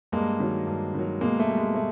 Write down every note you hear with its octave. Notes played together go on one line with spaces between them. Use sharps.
G2 G#3 A#3
D#3 F#3
G2
D#3 F#3
B2 G#3 A#3
A3
G3
G#3
B2 A3